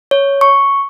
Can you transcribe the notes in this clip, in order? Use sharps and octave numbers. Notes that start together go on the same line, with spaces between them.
C#5
C#6